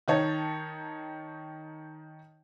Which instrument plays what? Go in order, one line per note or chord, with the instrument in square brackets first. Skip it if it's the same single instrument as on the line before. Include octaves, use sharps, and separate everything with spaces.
[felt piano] D#3 D#4 C#5 A5